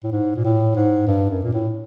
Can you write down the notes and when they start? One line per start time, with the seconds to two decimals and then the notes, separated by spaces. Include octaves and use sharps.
0.04 A2
0.12 G#2
0.36 A#2
0.44 A2
0.76 G#2
1.07 G2
1.30 F#2
1.43 A#2
1.53 A2